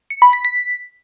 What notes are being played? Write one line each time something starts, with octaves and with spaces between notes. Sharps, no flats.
C#7
B5
B6
B6